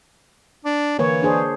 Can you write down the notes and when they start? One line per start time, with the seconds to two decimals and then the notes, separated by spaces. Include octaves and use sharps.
0.65 D4
0.99 D3 E3 A#3 C#5
1.23 D4 G#4 C5